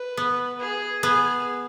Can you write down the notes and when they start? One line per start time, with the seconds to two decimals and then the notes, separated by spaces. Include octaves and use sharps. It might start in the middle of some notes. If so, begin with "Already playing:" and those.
Already playing: B4
0.17 B3
0.60 G#4
1.03 B3 G#4